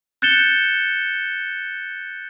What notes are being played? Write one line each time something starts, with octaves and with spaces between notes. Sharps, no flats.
F#6 G6 A6 C#7 E7 G7